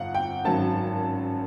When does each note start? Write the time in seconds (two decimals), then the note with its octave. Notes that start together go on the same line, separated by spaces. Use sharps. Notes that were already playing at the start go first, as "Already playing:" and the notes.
Already playing: G1 F2 F5 F#5
0.14 G5
0.45 G#1 F#2 D#3 F#3 A5